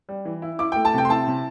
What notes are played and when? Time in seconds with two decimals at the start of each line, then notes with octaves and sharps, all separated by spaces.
0.09 G3
0.25 E3
0.42 E4
0.59 E4 D6
0.72 A3 G5
0.85 A5
0.94 C3 G5
1.05 C6
1.10 E4 A5
1.28 C3